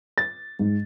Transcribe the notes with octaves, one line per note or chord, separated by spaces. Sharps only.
A6
G#2